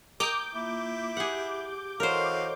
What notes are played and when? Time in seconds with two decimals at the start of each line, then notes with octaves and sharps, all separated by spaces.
0.20 D#5 G5 A#5 D6 G6
0.54 A#3 E4 F4
1.17 G4 G#4 F#5
2.00 E3 F#4 A4 A#4 C5 C#5 D#5 F5